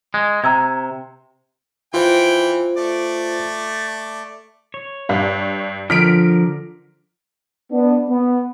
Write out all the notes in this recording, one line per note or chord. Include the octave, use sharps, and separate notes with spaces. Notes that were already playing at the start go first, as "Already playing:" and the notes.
G#3
C3 A#5 E6 G#6
E3 F4 C5 G5
A3 D5
C#5
G2
D3 F3 A#4 F6 B6 D7
B3 D4
B3